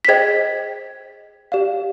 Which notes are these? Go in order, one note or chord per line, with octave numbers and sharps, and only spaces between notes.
B6
G#4 C5 D#5 G5 G#6
G4 D5 F5